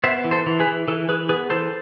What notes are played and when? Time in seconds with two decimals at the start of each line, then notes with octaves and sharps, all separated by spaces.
0.04 B3 C5 E5
0.24 E3
0.31 A4 C5
0.46 E3
0.60 G#4 B4
0.67 E3
0.88 E3 A4
1.09 E3 G#4 B4
1.29 B3 G#4 B4
1.50 E3 A4 C5